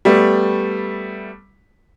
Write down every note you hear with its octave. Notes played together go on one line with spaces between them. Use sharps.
G3 A3 B3